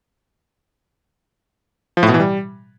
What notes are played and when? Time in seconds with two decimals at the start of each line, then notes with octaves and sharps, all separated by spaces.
1.97 F3
2.03 A2
2.08 B2
2.14 E3
2.20 G3